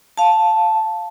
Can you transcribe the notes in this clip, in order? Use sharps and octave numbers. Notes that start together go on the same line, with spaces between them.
F5 A5